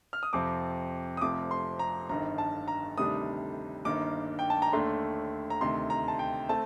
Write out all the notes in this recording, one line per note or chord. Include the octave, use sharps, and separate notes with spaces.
F6
D#6
F2 C3 F3 C4 D6
D#6
F1 F2 C3 F3 D6
C6
A#5
G1 G2 D#3 A#5
A5
A#5
D2 C3 D#3 G3 D4 D#6
G1 G2 D#3 A#3 D6
G5
A5
A#5
D#2 D3 A3 D4 C6
A#5
D2 C3 D#3 C6
A#5
A5
G5
A3 C4 A5